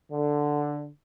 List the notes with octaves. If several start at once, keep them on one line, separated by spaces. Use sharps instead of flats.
D3